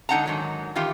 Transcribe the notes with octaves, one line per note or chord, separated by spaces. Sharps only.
D3 G#3 D#4 F#5 A5 A#5
G#2 D#3 F#3
D#3 E3 F4 G4